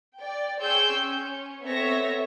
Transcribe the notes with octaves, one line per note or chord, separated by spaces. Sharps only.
D5 G5
G#4 C#5 G5 C6 E6 G6
C#4
B3 C4 A4 C#5 E5 A#6